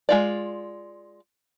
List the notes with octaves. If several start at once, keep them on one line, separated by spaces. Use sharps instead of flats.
G#3 F4 D5